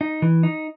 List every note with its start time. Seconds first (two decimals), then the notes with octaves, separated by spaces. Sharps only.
0.01 D#4
0.22 E3
0.43 D#4